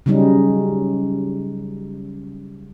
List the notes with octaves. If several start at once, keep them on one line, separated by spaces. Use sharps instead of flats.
C#3 F#3 G3 C#4 D#4